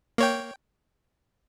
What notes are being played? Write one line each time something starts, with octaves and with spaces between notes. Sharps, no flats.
A#3 C#5 G5